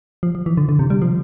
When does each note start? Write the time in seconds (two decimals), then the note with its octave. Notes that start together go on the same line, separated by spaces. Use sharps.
0.23 F3
0.35 F3
0.46 E3
0.57 D3
0.69 D3
0.79 C3
0.90 G3
1.02 F3